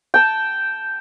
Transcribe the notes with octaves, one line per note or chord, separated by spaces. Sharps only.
G5 A5